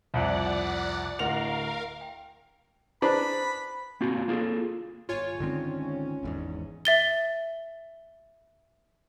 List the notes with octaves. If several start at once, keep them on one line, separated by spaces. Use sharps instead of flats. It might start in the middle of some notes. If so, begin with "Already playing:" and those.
C2 F2 D5 F#5
D1 A#4 F5 F#5 F7
G5
D4 G#4 B4 C5 A#5 B5
A#3 C4 F4 F#4
A#3 F4 G#4 A4
G1 F4 C#5 G#5
D3 D#3 G#3 C4 C#4
G#1 E2 G#2
E5 A6 G7